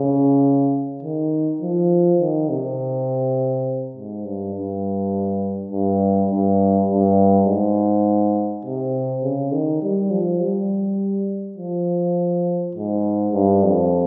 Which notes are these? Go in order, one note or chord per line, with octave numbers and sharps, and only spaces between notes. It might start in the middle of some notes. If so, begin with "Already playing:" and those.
Already playing: C#3
D#3
F3
D#3
C3
G#2
G2
G2
G2
G2
G2
G#2
C3
C#3
D#3
G3
F3
G3
F3
G#2
G2
F2